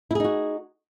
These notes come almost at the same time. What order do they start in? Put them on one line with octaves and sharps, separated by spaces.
E4 G#4 D#4 F#4